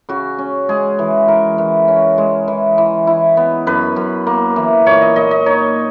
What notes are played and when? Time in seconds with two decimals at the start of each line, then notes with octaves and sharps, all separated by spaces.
0.09 C#3 F#4
0.39 C#4
0.69 G#3 G#4
0.99 E3
1.28 E3 A#4
1.58 E3
1.88 C#4
2.18 G#3
2.48 E3
2.78 E3
3.07 E4
3.37 B3
3.67 F#2 B4
3.96 F#2
4.27 A#3
4.56 E3
4.86 A#2 C#5
5.01 D#5
5.16 A#2 D#5
5.31 D#5
5.46 D#4 C#5